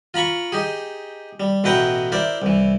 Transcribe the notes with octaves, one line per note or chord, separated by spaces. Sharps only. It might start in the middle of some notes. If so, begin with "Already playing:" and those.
F4 A#5 B5 C#6
D#4 G4 G#4
G3
A1 B2 E4 B4 G5 A#5
E4 A#4 C5 D5 E5
C2 E3